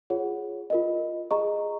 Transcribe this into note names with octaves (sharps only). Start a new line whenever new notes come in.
F4 G#4 C#5 F#5
F4 A#4 D#5
G#4 D#5 A#5 C#6